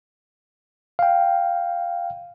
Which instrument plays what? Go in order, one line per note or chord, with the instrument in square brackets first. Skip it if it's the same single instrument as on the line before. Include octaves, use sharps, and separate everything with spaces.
[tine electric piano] F5 G5